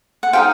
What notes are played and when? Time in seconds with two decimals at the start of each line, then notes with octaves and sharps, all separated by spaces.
0.23 F#5
0.33 D#4 G4 C5 F5 G5